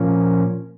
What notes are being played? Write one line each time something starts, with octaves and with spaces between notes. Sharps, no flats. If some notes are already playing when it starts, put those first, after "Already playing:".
Already playing: A#2 F3 A#3 C#4